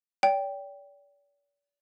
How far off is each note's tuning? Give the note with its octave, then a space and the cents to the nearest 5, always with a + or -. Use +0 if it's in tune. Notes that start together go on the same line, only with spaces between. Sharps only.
D5 -45 G5 +0